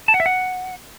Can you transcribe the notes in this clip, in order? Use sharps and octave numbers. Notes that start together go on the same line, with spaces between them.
A5
F#5
E5
F#5